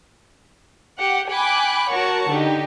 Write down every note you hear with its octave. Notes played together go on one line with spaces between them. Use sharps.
G4 F#5
G5 G#5 B5 D6 F#6
F#4 A#4 C#5 F#5 A5 C#6
D3 D#4 G4